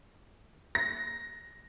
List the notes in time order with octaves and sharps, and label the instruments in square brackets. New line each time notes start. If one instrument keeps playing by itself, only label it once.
[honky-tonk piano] A#6